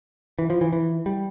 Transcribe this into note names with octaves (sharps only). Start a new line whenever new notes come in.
E3
F3
E3
E3
G3